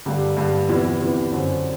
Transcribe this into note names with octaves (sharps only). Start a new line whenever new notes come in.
G2 D3 G4
G2 D3
E2 C3 E3 E4
E2 C3 E3
F#2 D3 C4